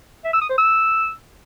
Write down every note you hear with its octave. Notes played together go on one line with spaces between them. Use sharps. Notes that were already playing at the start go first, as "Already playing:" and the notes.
E5
E6
D#6
C5
E6